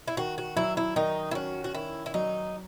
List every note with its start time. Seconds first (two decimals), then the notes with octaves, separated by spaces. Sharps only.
0.08 E4
0.17 D#3 F#4
0.38 F#4
0.56 F#3 E4
0.77 E4
0.96 D#3 D#4
1.31 E4
1.35 C#4 F#4
1.64 F#4
1.74 D#3 E4
2.06 E4
2.14 F#3 D#4